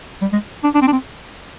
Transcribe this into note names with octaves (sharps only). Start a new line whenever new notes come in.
G3
G#3
D4
D4
C4
D4
C4